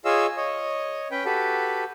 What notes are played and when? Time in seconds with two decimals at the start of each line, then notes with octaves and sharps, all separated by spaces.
0.05 F4 G#4 C#5 D#5 F5 E6
0.37 C#5 D#5
1.11 C#4 B4 G5
1.25 F#4 G4 A4 B4